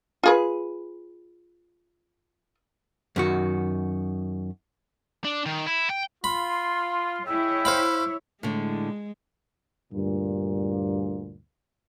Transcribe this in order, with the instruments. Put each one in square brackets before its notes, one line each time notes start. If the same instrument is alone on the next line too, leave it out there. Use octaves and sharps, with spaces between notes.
[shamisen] F4 G#4 B4
[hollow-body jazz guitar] F#2 D#3 F#4
[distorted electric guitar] D4
D#3
E4
G5
[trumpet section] F4 [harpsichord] B5 [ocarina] C6
[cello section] E4 C#5 [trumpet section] G#4 D#5 G5 [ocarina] E6
[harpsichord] C5 F5 B5
[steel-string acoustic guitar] A2 D3 [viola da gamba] G#3
[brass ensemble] D2 G2 A#2